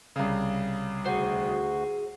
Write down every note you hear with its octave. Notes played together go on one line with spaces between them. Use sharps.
C2 C#3
D2 F#4 G#4 C5